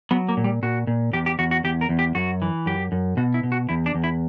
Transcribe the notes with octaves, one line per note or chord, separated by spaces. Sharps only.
F#3 B3
A#3
A#2
G3
A#2 F#4
A#2
E2 G4
G4
E2 F#4
F#4
E2 G4
A#4
E2
G4
F#2 F#4
E3
F#2 G4
F#2
B2 F#4
E4
B2
F#4
E2 E4
D4
E2
E4